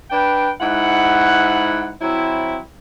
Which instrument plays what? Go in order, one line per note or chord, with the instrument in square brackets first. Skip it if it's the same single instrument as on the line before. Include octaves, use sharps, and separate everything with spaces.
[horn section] D4 B4 G5
G#2 E4 F#5
F#3 C4 E4